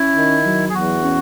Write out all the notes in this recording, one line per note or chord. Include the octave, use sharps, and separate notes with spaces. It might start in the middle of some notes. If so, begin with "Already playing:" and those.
Already playing: C#4 E4
D#3
F#3
G#4
E2 F#4
C#4